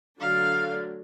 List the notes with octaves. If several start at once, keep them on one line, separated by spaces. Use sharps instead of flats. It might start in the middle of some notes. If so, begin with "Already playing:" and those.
D3 F#3 A3 D4 F5